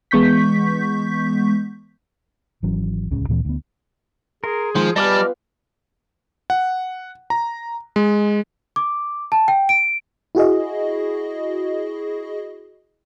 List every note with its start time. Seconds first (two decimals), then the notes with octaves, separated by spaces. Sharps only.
0.11 E3 G#3 B3 C#6 G6 B6
2.63 G#1 E3 F#3 C#4
3.11 D1 C#2 C#3
3.29 D2 A#2 E3 C4
3.45 D2 B3
4.44 G#4 A#4 C6
4.75 D#3 F3 G#3
4.96 G3 B3 F4 G#4 D#5 A5 D6 F6
6.50 F#5
7.30 A#5
7.96 G#3
8.76 D6
9.32 A5
9.48 G5
9.69 D7
10.35 E4 F#4 G#4 D#5